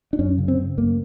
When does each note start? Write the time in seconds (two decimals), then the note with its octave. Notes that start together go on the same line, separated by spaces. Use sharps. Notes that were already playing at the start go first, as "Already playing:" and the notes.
0.13 D4
0.19 F#2 C#4
0.38 C#3
0.48 C4
0.57 C#3
0.78 F#2 A#3